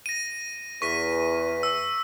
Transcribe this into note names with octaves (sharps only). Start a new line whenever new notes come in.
A#6 D#7
E2 C#6 B6 D#7
E6